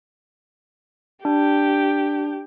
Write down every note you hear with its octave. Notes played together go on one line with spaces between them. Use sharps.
D4 G4